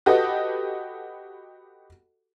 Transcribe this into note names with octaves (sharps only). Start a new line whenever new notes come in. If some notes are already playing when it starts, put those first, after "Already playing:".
F#4 G4 A4 B4 D#5